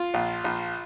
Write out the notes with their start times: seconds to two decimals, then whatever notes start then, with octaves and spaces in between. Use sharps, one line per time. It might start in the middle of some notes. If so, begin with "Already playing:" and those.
Already playing: F4
0.14 A#1
0.44 A#1